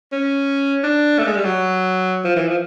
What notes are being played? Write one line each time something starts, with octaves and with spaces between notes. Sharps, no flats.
C#4
D4
A3
G#3
G3
F#3
F3
E3
F3